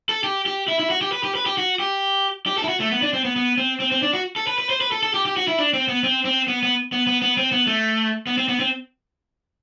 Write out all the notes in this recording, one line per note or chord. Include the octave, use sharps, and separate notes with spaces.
A4
G4
G4
E4
E4
F#4
G4
B4
G4
B4
G4
F#4
G4
G4
A4
E4
F#4
A3
B3
D4
C4
B3
B3
C4
C4
C4
D4
F#4
A4
B4
B4
C5
B4
A4
A4
G4
G4
F#4
E4
D4
C4
B3
C4
C4
B3
B3
B3
B3
B3
C4
B3
A3
B3
C4
B3
C4